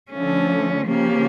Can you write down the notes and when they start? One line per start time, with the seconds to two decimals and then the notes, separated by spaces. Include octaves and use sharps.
0.10 D3 F3 A3 C#4
0.87 C#3 F3 A#3 C#4 G4